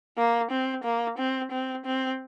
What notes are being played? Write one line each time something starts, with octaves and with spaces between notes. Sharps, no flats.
A#3
C4
A#3
C4
C4
C4